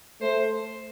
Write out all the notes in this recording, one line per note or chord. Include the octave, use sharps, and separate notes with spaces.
A3 C5